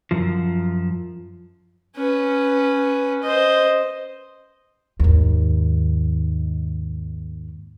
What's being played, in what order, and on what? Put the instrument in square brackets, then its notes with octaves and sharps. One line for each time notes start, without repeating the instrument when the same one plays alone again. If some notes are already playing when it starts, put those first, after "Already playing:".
[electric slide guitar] F#2 F3
[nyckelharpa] C#4 B4
C5 D#5
[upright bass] D#2 G#2